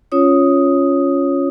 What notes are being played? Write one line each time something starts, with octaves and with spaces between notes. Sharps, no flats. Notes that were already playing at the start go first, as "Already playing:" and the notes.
C#4 F4 C#5 D#6